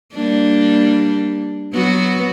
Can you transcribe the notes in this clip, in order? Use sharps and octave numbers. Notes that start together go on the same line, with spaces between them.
G3 A#3 D4
F#3 B3 F#4